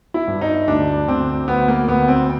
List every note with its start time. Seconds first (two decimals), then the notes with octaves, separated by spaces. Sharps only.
0.14 E4
0.27 G2
0.41 D#4
0.67 D2 D4
1.08 D2 C4
1.47 D2 B3
1.68 A#3
1.88 D2 B3
2.08 C4